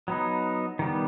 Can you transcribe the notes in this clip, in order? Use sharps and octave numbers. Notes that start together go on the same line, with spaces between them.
F#3 B3 D#4
D#3 G3 B3